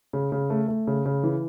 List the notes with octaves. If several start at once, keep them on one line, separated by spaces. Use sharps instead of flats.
C#3
C#3
A3
A3
C#3
C#3
E3